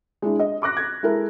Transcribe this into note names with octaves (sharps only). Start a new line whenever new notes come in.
G#3 D4 E4
D#5
C#6 D6 F#6 A#6
G#6
G#3 E4 A4 A#4